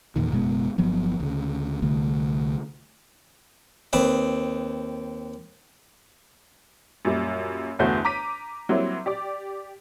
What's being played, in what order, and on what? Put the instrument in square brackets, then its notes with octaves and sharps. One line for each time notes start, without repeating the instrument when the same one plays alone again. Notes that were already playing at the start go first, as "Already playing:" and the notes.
[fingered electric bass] E2 A#2 D#3
F#1 B2 G#3 B3
G1 F3 F#3 B3
D2 C#3
C2 D3 A3
[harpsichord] D#2 C4 B4 B5
[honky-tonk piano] F#2 A#2 G3
G1 E2 A3 F#4 C5 G6
A#5 D6 B6 D#7
F#3 G3 A#3 C4 E4
G4 D5 D6